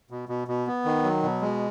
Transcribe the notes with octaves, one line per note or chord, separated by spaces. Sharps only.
B2
B2
B2
B3
D#3
F#3
B2
G#3